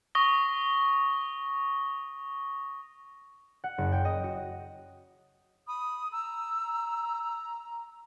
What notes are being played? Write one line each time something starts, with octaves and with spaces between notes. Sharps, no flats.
C#6 D#6 A#6 G7
F#5
F#1
G5
D#5
F#4
B5 D#6
A#5 E6